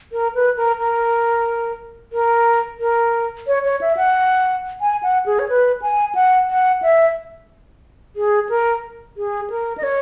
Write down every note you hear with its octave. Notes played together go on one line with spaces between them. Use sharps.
A#4
B4
A#4
A#4
A#4
A#4
C#5
C#5
E5
F#5
G#5
F#5
G#4
C#5
B4
G#5
F#5
F#5
E5
G#4
A#4
G#4
A#4
D#5
C#5